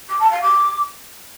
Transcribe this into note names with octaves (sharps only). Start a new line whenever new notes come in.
D6
A5
F5
D6